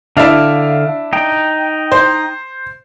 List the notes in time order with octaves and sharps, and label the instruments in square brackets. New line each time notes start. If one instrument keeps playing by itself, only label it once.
[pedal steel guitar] D3 F5 [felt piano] D4 E4 E5
[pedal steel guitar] D#4 G5
[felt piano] C5